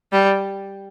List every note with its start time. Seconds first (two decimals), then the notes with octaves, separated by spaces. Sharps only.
0.13 G3